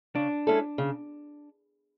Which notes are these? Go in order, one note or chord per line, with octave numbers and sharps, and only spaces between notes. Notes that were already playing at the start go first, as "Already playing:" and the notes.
C#3 D4
G#3 C#4 E4 A4
C#3